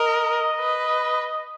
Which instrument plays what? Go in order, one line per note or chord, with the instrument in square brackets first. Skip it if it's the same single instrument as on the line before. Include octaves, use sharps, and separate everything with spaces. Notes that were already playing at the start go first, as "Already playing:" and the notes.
Already playing: [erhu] A#4 [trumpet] D#5
[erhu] B4